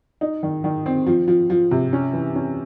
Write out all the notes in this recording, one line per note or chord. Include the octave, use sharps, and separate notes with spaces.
D#4
D#3
D#3
C4
F3
F3
F3
C3
C#4
E3
C#4